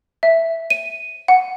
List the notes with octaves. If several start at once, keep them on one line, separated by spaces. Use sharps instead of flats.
E5
D#7
F#5